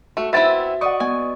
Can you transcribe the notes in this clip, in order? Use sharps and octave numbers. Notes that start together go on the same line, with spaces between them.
A3 F#4
B3 C4 E4 E5 A6
D5 D#5 F#5 C#6 D#6
B3 G#5